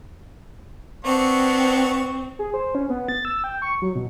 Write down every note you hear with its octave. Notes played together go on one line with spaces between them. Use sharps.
B3 C4 D4 C#6
G#4
C5
C#4
B3
A6
E6
G5
C#6
F#3
B2